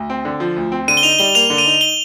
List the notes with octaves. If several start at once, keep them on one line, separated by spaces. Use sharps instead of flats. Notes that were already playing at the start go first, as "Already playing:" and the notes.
Already playing: D2
C4
D3
F3
D2
C4
D3 D#7
G7
D#4 F7
G3 G7
A#3 F7
D3
D#7
D#4
G7